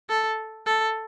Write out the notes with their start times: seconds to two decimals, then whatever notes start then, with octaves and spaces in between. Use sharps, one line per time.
0.10 A4
0.67 A4